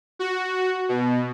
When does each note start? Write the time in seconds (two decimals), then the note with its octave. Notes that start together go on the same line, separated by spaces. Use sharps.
0.19 F#4
0.89 B2